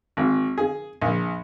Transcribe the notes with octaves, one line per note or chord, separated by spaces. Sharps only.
G#1
G#4
A#1